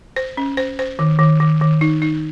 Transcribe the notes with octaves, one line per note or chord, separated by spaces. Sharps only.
C5
C#4
C5
C5
D#3
D#3
D#3
D#3
D#4
D#4